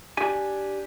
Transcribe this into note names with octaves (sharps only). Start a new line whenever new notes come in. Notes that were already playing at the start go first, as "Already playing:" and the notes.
D4 G4 G#5